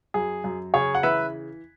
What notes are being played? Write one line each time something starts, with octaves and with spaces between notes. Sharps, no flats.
F#2 G#4
F#2
C#3 G#4 C#5
F#5
E3 B4 E5